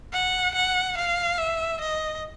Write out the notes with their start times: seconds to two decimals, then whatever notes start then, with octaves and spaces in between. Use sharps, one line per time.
0.13 F#5
0.54 F#5
0.97 F5
1.38 E5
1.80 D#5